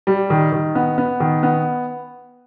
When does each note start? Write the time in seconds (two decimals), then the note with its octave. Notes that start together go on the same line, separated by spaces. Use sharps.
0.07 G3
0.30 D#3
0.52 D#3
0.75 B3
0.98 B3
1.20 D#3
1.43 B3